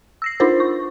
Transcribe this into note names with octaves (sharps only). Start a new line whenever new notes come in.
E6 A#6 C7
D4 D#4 F4 A#4 C5
C#6